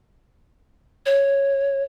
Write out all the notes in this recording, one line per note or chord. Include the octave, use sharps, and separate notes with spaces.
C#5